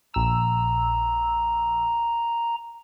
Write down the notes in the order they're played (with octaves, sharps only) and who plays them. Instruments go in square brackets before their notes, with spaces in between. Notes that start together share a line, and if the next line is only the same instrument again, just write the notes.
[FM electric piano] A#1 E6 [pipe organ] A#5